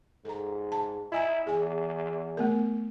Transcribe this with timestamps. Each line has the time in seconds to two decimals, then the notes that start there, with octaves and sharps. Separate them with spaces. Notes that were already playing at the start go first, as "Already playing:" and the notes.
0.25 G#2 A4 A#5
0.72 A5
1.12 E4 D#5 G#5 A#5
1.47 E2 G#4 G#5
2.37 A3 B3 A#4